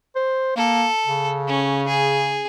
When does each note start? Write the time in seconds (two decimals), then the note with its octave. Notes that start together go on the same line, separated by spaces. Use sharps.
0.16 C5
0.56 A#3 A4
1.06 C#3
1.47 C#4
1.88 G#4